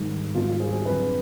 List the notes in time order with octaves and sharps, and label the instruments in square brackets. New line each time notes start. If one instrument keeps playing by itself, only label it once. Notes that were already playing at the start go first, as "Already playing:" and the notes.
Already playing: [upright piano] G#2 D#3 G3
G#2 D#3 G3 F4
F4
G#4
G#4
F2 D3 F#3 B4